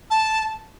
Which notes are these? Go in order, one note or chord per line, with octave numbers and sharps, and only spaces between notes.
A5